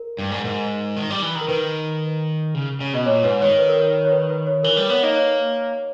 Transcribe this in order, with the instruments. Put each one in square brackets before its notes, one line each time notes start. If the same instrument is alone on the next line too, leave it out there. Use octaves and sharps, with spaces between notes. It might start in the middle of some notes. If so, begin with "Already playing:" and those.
Already playing: [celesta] A#4
[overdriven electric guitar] G2
G#2
[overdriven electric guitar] G#2 [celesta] A#4
[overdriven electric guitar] D#3
G3
E3
D#3
[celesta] A#4
[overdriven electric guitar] D#3 [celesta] B4
[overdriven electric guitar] C#3
C#3
[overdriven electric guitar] B2 [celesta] D#5
[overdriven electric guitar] A#2 [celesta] C#5
[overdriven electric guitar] G#2 [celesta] B4
[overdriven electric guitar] D#3 [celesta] C#5
[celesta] B4
A#4
B4
C#5
B4
B4
C#5
[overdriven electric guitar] E3 [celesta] A#4
[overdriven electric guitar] G3 [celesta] B4
[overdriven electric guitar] B3 [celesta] C#5
[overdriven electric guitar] A#3 [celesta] D#4 D#5
[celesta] C#5